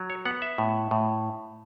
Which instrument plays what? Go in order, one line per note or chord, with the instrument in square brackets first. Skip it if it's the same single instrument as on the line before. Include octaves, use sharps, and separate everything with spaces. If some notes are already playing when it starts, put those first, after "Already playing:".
Already playing: [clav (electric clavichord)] F#3
C#5
B3 F#5
E5
A2
A2